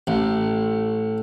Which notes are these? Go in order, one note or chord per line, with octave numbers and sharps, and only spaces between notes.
A1